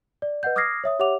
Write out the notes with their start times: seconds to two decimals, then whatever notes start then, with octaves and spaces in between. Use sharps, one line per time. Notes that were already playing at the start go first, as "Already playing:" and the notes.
0.22 D5
0.43 B4 D#5 F#5 G6
0.56 D6 D#6 F6 G#6 A#6 C7
0.84 C#5 E5 D#6
0.99 G4 C#5 E5 F#5 D6 F7